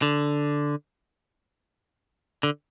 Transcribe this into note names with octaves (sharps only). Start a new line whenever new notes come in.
D3
D3